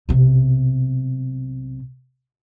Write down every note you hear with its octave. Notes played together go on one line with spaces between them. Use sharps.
B1 C3